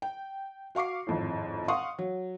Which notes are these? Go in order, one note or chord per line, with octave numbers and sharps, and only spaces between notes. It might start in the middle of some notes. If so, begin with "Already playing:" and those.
G5
F#4 F5 C#6 D6 C7
G#1 F2 A2
F5 F#5 C6 C#6 D#6
F#3